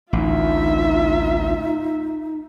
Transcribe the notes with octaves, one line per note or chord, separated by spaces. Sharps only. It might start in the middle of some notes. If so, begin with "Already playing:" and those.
A1 D2 D#4 F4 E5